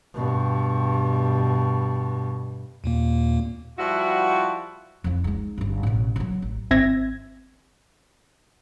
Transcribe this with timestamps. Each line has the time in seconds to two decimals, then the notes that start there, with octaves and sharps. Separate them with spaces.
0.14 G2 B2
2.84 D#2 A#2 A#3
3.78 F3 G3 E4 F#4
5.04 F2 E4
5.24 G#3 D#4
5.58 G1 G2
5.83 A1 B2
6.16 C#3 F#3
6.42 A1
6.71 G#1 C4 E5 G#6 A#6